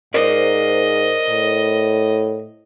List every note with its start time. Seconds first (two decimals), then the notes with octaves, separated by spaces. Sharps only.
0.14 G#2 A#4 C5 D5 D#5
1.29 A2